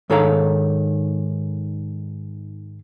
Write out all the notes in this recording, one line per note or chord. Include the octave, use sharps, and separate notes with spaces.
G#2 D#3 A4 C#5 F5 A#5